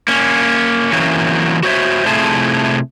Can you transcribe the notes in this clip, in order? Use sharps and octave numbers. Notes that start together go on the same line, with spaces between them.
A#3 C#4
E3 F#3 A#3 C4 C#4
F#4 C5 C#5 E5
C3 A3 E4 F4 G#4 A5